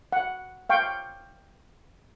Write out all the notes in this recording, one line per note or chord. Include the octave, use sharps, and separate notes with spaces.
F#5
F5 G5 C#6